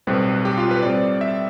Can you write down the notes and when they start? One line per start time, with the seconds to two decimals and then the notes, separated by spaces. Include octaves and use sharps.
0.07 B1 A2 G3 C4 B4
0.45 G4
0.58 F4
0.71 B4
0.82 A2 G3 C4 D5
1.21 E5